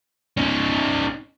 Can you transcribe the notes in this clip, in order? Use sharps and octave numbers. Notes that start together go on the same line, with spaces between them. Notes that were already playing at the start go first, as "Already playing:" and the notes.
C#4 D#4